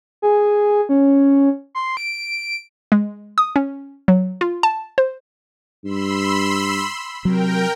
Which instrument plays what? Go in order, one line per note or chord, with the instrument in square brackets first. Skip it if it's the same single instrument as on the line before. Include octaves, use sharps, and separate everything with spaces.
[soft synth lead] G#4
C#4
C6
D7
[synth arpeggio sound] G#3
D#6
C#4
F#3
F4
A5
C5
[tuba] G2 [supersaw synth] B5 C6 E6
[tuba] C3 [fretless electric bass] F#3 [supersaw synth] A#4 G5